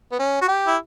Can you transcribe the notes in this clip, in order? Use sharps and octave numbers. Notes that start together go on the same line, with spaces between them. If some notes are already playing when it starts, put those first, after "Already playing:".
B3
C#4
F#4
G4
E4